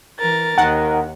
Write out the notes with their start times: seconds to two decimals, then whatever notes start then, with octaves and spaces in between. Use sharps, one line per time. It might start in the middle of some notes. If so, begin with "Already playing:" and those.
0.18 E3 A#4 A6
0.58 D#2 D#4 A#4 F#5